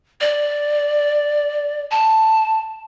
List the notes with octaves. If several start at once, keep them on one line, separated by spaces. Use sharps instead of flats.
D5
A5